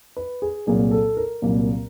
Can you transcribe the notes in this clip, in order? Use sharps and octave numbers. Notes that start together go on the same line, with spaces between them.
B4
G#4
C2 A#2 F#3 A#3 G#4
A4
A#4
C2 A#2 F#3 A#3